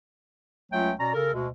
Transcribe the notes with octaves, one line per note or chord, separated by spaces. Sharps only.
C#2 F#3 A3 C#4 F4 G5
B2 C#4 D5 A#5
C#3 A4 A#4
D2 B2 G#3